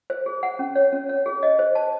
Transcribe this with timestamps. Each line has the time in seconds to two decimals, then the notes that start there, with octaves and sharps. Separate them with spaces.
0.10 C5
0.26 G#4
0.43 F#5
0.59 C#4
0.75 C#5
0.93 C#4
1.09 C#5
1.26 G#4
1.43 D#5
1.59 C5
1.75 A5